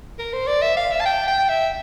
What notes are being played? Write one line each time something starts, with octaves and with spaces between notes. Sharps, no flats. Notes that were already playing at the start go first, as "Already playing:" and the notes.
A#4
C5
D5
E5
F5
E5
A5
G5
G5
E5